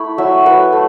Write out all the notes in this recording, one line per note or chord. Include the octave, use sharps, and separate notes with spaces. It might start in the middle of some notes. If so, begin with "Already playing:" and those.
Already playing: A3 E4 B5 C#6
F#3 E5
F#3 B4
A3